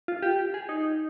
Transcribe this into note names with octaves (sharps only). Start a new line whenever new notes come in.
F4
G4
G#4
D#4